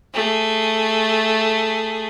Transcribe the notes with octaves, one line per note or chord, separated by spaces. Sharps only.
A3 G#4